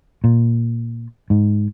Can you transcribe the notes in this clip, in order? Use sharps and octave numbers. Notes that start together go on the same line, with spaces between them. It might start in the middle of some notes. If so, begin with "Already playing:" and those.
A#2
G#2